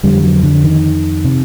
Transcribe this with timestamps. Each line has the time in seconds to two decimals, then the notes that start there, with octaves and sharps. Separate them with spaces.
0.03 F2 D3 G3
0.23 F#3
0.43 D3
0.64 D#3
1.24 C3